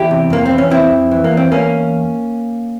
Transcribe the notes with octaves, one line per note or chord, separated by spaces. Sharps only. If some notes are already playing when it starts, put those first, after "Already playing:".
Already playing: E2 E4 G4
C3
F2 A#3
C4
E3
C#4
F2 C4 E4
F2
E3
A#3
E2
C4
E2 A#3 C#4